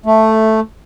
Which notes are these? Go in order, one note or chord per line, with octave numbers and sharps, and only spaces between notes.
A3